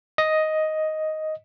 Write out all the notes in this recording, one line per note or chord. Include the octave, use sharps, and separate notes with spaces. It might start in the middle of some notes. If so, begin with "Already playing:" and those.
D#5